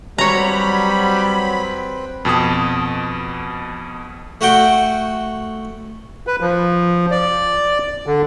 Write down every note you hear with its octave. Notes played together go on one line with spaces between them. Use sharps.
F#3 G3 C4 B4 C#5 A#5 B5
F2 B2 A5 D#6
A3 F#4 F#5 G5
B4
F3
D5
D3